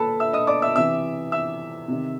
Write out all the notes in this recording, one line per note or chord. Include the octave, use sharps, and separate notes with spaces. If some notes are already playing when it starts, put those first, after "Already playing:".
Already playing: A#2 A4 B4 A5 B5
E5 E6
D#5 D#6
D5 D6
E5 E6
C3 E3 E5 E6
E5 E6
C3 D#3